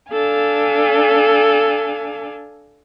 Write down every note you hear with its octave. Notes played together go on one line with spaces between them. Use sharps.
D4 A4 F5 G#5